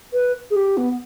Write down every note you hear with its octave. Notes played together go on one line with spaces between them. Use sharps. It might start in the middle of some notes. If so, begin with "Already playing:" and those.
B4
G#4
G4
B3